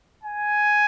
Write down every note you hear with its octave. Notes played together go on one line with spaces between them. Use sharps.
G#5